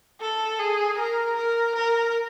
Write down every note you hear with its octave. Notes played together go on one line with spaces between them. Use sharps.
A4
G#4
A#4
A#4
A#4